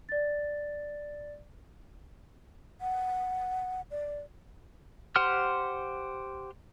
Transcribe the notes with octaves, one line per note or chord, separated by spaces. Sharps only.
D5 A6
F#5
D5
G4 C5 F#5 C6 F6